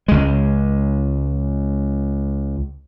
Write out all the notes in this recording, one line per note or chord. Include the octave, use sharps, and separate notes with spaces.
C#2 G#3